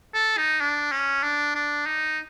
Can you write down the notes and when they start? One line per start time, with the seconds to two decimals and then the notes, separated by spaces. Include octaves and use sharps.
0.14 A4
0.38 D#4
0.61 D4
0.92 C#4
1.23 D4
1.55 D4
1.86 D#4